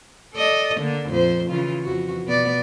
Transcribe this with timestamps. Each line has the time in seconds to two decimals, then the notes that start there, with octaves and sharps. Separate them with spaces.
0.34 A4 D5 D#5
0.79 D3 A#3 D4
1.09 F2 A#2 C5
1.50 C#3 E3 F4
1.83 F2 E3 F#4
2.25 B2 B3 D5